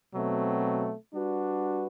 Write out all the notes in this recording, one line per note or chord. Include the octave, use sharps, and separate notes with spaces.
B2 F#3 A3 C4
G3 D4 F#4 B4